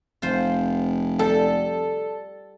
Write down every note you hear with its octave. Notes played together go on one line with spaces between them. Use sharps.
F1 F4 C5
G3 A4